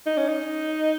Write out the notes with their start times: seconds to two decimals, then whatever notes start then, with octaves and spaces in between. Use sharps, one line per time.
0.06 D#4
0.18 C#4
0.29 D#4